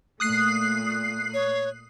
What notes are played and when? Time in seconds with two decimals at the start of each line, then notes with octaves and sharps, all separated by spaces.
0.20 A#2 A3 D#6 F#6 C7
1.34 C#5